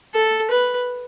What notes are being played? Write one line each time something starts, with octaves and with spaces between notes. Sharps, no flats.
A4
B4